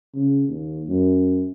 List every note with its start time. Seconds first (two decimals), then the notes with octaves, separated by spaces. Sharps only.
0.15 C#3
0.49 D#2
0.88 F#2